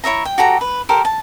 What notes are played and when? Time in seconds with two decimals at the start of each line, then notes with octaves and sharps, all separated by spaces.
0.04 E4 C#5 E5 A#5
0.25 G5
0.38 F#4 G4 A4 A#5
0.61 B4
0.89 G4 A4 A#4 C5
1.05 A5